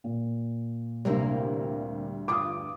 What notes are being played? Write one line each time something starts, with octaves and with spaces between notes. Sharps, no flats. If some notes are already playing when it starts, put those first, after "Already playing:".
A#2
D2 C3 G3 A#3 E4
E2 G2 F4 D6 D#6